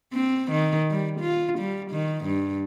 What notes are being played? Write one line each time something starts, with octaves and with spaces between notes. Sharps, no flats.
C4
D#3
G3
F4
G3
D#3
G2